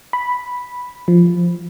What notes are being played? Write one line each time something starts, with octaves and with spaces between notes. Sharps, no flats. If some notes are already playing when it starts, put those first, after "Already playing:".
B5
F3